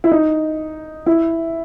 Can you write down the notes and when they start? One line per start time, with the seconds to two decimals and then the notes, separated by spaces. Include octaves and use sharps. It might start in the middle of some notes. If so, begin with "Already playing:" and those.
0.04 E4
0.12 D#4
1.06 E4